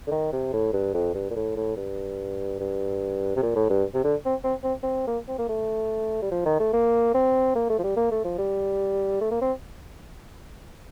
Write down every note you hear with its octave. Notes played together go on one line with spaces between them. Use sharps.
D3
D#3
C3
A2
G2
F2
G2
A#2
A2
A2
G2
G2
C3
A#2
A2
G2
C3
D3
C4
C4
C4
C4
A#3
C4
A#3
A3
G3
F3
D#3
A3
A#3
C4
A#3
A3
F3
G3
A#3
A3
F3
G3
A3
A#3
C4